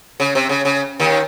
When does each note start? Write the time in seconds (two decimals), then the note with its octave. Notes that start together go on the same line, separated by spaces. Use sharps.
0.20 C#3
0.35 C3
0.49 C#3
0.65 C#3
1.00 D#2 D#3